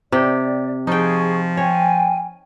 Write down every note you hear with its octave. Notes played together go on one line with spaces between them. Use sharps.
C3 G4 D5
F3 D#4 G#4 G5 C#6
C#5 G5 G#5